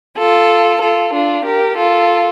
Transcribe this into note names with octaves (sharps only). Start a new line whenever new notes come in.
F4 A4
F4 A4
D4 F4
G4 A#4
F4 A4